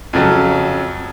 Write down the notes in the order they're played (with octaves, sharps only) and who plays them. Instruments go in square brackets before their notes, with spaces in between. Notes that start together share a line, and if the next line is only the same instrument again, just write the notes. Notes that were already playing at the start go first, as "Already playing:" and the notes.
[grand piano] F2 C#3 F#3